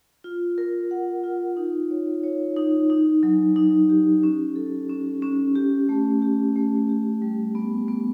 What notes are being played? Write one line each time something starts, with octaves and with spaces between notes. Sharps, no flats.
F4
A#4
F#5
F4
D#4
C#5
C#5
D#4
D#4
F#3
D#4
G4
C#4
A4
C#4
C#4
G4
A3
G4
A3
G4
G3
B3
B3